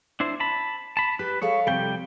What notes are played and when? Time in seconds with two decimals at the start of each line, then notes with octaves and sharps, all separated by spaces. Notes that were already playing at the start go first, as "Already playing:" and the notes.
0.20 D4 E4 C5
0.40 A5 B5
0.97 A5 B5
1.19 G4 B4
1.42 G#4 A4 C#5 F5
1.67 C3 F3 G3 G5